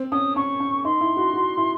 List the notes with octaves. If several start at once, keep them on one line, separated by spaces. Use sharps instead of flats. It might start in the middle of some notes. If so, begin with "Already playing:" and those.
Already playing: C4
C#4 D#6
C#4 C#6
C#4
D#4 C6
E4
F#4
F#4
E4